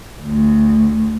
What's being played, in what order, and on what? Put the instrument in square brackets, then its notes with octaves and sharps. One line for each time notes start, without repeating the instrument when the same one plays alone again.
[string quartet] D2